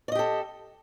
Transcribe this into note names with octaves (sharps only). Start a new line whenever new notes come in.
G4 A4 D5 D#5